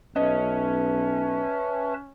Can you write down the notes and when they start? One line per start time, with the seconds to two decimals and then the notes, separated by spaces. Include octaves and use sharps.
0.16 B1 C#4 B4 D#5 E5 A5